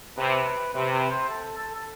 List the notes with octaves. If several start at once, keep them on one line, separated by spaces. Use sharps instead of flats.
C3 B4
C3 B4
B4
C5
A4
A4
A4